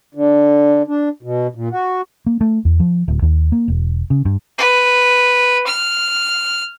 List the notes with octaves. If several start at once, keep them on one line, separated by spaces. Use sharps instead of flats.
D3
D4
B2
A#2
F#4
A#3
A3
E2
F3
D1
D#2
A#3
E1
C#3
G2
B4
F6